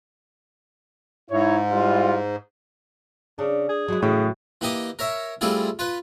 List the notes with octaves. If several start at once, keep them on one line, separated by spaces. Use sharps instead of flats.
G#2 D#4 E4 C#5
G3 E4 F4
C#3 D4
G#4
F#3 G#3 E4
A2 C#3 E3 F#3
E3 A#3 G4 D#5
A#4 C#5 E5
G3 A3 C4 E4 F4 G#4
F4 B4